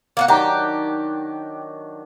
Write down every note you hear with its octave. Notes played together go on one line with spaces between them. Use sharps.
A#3 F4 F#4
D#3 F#3 D4 G4 E5 F#5 A#5